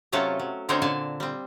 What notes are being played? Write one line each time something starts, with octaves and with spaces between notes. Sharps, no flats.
C3 F#3 A3 C#4 F4 A4
F#3
D3 C4 C#4 D#4 C5 C#5
A#2 D3 G#5 A5
G3 C4